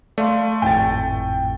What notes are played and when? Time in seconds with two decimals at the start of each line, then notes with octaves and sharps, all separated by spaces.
0.18 A3 D5 F5 C6
0.62 G#1 F2 A2 G5 A6